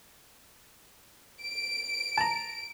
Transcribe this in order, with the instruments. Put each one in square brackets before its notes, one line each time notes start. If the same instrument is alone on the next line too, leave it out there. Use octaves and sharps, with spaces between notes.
[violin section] D7
[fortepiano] A5 A#5